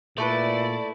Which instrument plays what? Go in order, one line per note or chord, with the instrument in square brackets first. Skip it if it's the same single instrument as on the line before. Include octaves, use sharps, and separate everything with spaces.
[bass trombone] A#2 [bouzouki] A3 A4 B4 [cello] E4 [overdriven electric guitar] D5